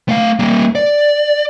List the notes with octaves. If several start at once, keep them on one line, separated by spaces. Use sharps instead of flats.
A3 F5
G3 A#3
D5